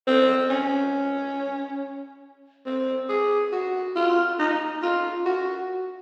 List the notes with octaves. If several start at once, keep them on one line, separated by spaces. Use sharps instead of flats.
C4
C#4
C4
G#4
F#4
F4
D#4
F4
F#4